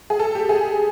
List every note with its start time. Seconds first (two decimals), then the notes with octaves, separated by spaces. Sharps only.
0.10 G#4
0.20 A4
0.35 G4
0.49 G#4